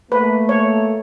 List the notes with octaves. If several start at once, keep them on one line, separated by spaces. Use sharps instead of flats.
A3 A#3 B4
C#5